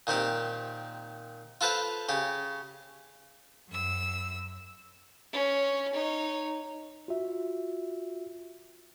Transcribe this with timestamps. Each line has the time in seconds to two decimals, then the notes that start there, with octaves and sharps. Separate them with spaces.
0.07 A#2 D#3 C4 G4
1.61 F4 A4 B4 C5 F5
2.09 C#3 G4
3.68 F#2 E6
5.33 C#4
5.93 D#4 C#5
7.08 F4 F#4 E5